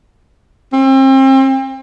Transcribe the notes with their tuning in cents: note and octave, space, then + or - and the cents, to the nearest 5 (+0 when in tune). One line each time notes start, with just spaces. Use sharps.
C4 +35